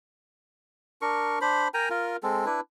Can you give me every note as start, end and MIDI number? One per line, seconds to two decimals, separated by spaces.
1.02 1.39 62
1.02 1.39 70
1.02 1.39 85
1.41 1.68 62
1.41 1.68 72
1.41 1.68 83
1.74 1.89 70
1.74 1.89 79
1.74 1.89 80
1.74 1.89 82
1.90 2.17 65
1.90 2.17 70
2.23 2.46 56
2.23 2.46 60
2.23 2.46 69
2.46 2.60 62
2.46 2.60 64
2.46 2.60 71